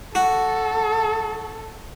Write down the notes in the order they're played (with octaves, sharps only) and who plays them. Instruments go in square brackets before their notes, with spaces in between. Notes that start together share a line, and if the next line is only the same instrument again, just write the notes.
[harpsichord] F#4 [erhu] A4